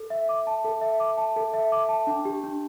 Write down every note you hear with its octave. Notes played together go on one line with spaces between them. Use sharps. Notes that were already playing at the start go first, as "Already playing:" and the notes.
Already playing: A4
E5
D6
A5
A4
E5
D6
A5
A4
E5
D6
A5
D4
G4
D4